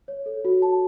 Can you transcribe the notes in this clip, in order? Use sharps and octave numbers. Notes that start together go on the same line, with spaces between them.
C#5
A4
F#4
A5